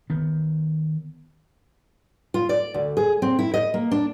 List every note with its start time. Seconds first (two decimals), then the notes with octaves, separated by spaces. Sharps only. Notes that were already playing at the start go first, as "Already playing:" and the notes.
0.10 D#3 B3
2.34 F4
2.49 D5
2.74 D2
2.97 G#4
3.22 C4
3.39 E4
3.54 D#5
3.74 A#3
3.91 D4